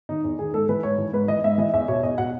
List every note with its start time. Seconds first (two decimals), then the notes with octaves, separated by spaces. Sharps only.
0.09 D#3 D#4
0.24 E2
0.39 D#3 G#4
0.54 G#2 A4
0.69 E3 B4
0.83 G#2 C#5
0.98 E3
1.13 G#2 B4
1.28 E3 D#5
1.44 G#2 E5
1.58 E3 D#5
1.73 E2 E5
1.88 B2 C#5
2.03 E2 D#5
2.18 B2 F#5